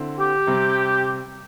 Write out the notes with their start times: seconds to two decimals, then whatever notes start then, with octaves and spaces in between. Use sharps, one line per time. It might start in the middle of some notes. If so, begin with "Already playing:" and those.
Already playing: D3 C4 E4
0.19 G4
0.47 C3 G3 C4